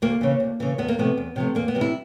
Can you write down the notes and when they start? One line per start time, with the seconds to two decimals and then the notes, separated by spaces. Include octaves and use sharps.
0.02 D2 A#3
0.21 C#3 E3
0.40 D2
0.60 C#3 E3
0.78 E2 B3
0.88 A#3
0.99 C3 F3 A3 B3
1.17 E2
1.36 C3 F3 A3
1.55 E2 A#3
1.68 B3
1.75 C3 E3 G3
1.81 E4